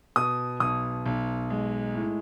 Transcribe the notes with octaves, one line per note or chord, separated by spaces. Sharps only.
B2 D#6
B1 D#6
B1
G#3
A2